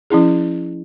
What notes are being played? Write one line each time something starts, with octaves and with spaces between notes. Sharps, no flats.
F3 C#4 E4 G#4